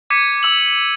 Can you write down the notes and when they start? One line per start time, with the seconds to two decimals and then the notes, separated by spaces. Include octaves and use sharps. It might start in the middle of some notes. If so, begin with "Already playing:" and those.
0.10 D6 G#6 B6 C#7 D#7
0.43 D6 E6 F#7